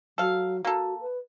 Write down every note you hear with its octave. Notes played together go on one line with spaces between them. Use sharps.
F#3 A4 F5
A#3 F#4 A4
B4